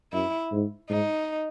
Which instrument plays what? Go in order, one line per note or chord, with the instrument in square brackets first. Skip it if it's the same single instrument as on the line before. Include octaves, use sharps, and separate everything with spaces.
[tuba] F#2 [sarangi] E4
[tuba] G#2
[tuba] G#2 [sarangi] D#4